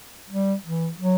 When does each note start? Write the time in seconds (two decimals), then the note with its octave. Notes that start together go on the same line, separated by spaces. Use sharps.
0.30 G3
0.65 E3
0.99 F#3